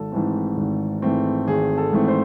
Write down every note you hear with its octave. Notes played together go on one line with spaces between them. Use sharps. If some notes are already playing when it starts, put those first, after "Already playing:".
Already playing: G#1 A4
G#2 E3 A3 C4
G#1
G#2 E3 A3 C4
G#1 G#4
A4
G#2 E3 A3 C4
C5